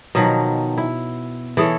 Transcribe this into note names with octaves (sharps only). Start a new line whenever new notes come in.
B2 D#3 F3 F#3
E4
E3 G#4 A4 C#5